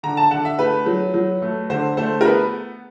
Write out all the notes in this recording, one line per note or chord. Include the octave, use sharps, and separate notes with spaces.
D3 A#5
A5
D3 F#5
E5
A3 B4
F#3
F#3
A3
D3 C5
A3 C5
A#4
B3 B4